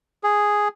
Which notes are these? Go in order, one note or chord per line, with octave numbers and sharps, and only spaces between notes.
G#4